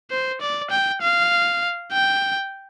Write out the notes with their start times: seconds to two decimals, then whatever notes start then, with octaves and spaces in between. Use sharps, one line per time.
0.11 C5
0.41 D5
0.71 G5
1.01 F5
1.93 G5